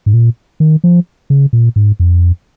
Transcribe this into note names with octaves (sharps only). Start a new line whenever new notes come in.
G#2
A#2
D#3
F3
C#3
A#2
G#2
F2